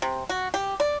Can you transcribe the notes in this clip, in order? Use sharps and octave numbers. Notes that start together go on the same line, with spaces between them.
C3
F#4
G4
D5